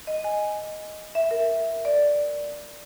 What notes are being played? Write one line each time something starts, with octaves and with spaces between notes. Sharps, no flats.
D#5
G#5
E5
A#4
D5